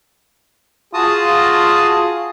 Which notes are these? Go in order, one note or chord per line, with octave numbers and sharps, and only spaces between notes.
F4 F#4 G#4 A5 D#6